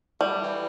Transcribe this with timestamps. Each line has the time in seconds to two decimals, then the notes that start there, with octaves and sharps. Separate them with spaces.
0.21 G3 A3
0.42 E3